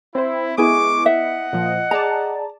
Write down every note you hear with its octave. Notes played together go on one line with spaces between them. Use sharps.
C4 E4 C5
G#3 B3 E4 G#4 C#6 D6
D#5 E5 F#5
A#2 F3
G#4 D5 A5 A#5